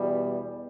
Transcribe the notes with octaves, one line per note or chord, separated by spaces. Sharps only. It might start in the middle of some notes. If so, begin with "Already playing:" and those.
Already playing: E2 B2 G3